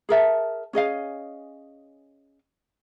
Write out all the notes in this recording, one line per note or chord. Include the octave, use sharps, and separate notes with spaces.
G#4 A#4 E5 A5
C#4 G#4 D#5 F5